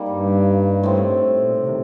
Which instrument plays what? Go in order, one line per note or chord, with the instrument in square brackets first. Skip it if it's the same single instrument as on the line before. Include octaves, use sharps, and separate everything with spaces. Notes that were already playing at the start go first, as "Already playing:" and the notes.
Already playing: [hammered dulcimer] G3 A#3 D#4
[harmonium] G2
[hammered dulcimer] A2 A3 C4
[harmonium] A#2
C3
D#3